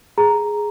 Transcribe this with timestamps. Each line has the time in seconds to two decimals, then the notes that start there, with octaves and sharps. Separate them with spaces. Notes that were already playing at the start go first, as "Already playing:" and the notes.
0.18 G#4 A#5